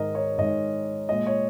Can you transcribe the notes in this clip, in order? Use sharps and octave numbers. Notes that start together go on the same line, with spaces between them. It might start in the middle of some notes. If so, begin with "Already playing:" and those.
Already playing: G#2 D#3 G#3 A#4 D#5
C#5
G#2 D#3 G#3 D#5
A#2 G#3 D#5
C#5